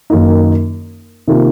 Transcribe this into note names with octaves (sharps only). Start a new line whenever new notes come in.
F#2 D#3 A#3 D#4
C3 D#3 A#3 F4 A#4